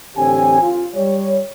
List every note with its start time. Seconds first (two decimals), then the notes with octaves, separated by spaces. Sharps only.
0.16 A1 D3 C4 C#4 G4 G#5
0.61 F4
0.95 G3 C#5